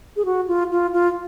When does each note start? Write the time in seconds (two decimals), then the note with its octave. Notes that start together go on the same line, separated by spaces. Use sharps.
0.16 G#4
0.25 F#4
0.48 F4
0.71 F4
0.93 F4